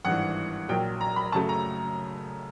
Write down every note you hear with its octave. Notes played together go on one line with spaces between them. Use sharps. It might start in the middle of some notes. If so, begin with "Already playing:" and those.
G#1 G2 E3 F#5
A#1 A#2 F#3 G5
A#5
B5
F#2 C#3 F#3 A3 A5
A#5